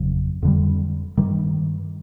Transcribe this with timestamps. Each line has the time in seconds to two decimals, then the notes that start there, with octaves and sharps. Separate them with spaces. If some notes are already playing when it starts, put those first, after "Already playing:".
Already playing: G1 F2 C#3 F#3
0.43 F2 D3 G3
1.17 G2 D#3 G3